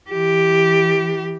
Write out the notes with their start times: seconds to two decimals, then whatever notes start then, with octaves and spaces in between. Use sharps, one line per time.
0.10 E3 G4